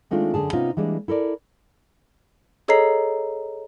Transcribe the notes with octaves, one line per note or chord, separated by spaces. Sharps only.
D#3 G#3 A3 C4 D4 F4
F#2 D3 G#4 A5
C3 B3 C#4 D#4 F4
E3 G3 G#3 A#3 D4
E4 A4 A#4 D5
G#4 A4 C#5 D#5 A#5 C7